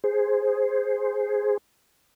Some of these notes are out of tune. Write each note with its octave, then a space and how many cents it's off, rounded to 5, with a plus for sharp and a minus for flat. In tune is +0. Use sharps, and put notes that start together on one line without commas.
G#4 +0 C5 +0